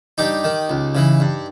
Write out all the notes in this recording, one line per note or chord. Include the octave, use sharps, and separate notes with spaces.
G2 D#4 G4
D#3
C#2
C#3 E3
G2